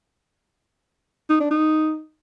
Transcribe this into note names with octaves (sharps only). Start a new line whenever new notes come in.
D#4
D4
D#4